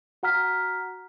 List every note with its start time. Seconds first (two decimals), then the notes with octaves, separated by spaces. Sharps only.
0.23 F#4 F#5 A#5 F6 B6